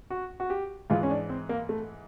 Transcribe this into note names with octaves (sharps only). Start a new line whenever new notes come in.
F#4
F#4
G4
G#2 E3 G#3 F4
C#4
D4
C4
A#3
A3